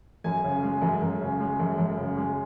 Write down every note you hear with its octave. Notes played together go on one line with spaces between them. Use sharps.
F#2 G#5
C#3
G#3
F#2
F#2
C#3
G#3
F#2
F#2
C#3
G#3